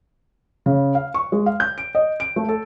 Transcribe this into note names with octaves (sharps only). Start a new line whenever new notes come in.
C#3
F5
C#6
G#3
F5
G6
D7
D#5
D7
A3
A4